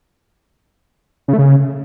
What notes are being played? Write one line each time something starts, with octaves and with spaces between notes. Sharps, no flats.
C#3
A3
C#3